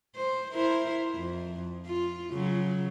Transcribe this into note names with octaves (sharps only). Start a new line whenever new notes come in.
C5
E4 A#4 C5
F2
F4
C#3 F#3